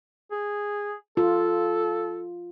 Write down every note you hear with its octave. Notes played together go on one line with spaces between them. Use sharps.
G#4
F4 A4